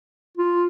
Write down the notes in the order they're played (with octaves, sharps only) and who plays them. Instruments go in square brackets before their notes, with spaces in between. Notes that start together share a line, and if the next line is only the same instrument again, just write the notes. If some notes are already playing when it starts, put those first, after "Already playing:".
[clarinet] F4